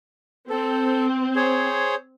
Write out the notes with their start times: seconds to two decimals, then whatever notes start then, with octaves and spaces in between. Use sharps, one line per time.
0.50 C4 A4
1.36 G#4 C5 C#5